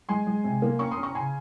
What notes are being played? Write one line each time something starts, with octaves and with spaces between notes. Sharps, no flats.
G#3 G#5 C6
G#3
C3
A#3
C#4 A#5 C#6
C6 D#6
C#4
A#5 C#6
C#3 G#5 C6